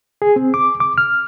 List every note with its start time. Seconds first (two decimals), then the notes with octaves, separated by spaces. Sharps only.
0.22 G#4
0.36 C4
0.54 D6
0.80 D6
0.98 F6